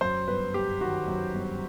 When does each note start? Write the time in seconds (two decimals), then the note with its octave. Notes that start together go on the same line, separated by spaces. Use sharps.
0.01 F#2 C5
0.28 G1 B4
0.54 G1 G4
0.81 D#3 F#4
1.08 F#2
1.34 G1